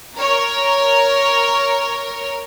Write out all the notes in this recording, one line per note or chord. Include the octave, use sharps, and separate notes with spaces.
A#4 C#5